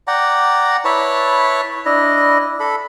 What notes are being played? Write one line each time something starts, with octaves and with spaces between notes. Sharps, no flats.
D5 F#5 G5 A#5
E4 B4 C#5 A5
D4 E4 D#5
A4 B5